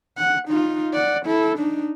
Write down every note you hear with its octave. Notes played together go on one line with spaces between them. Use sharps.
F#5
D#4 F4
D5 F#5
E4 A4
D4 D#4